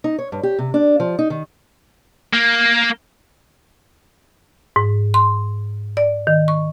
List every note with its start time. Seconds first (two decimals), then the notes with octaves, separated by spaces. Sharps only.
0.04 D#4
0.19 C#5
0.32 G2
0.43 G4
0.59 C3
0.74 D4
1.00 F3
1.19 D#4
1.30 D#3
2.33 A#3
4.76 G#2
5.14 C6
5.97 D5
6.27 D#3
6.48 C#6